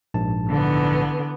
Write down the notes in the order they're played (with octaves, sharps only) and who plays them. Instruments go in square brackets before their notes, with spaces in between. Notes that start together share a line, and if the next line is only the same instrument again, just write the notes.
[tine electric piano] A#1 G#2 A5
[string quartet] D3 E3 B3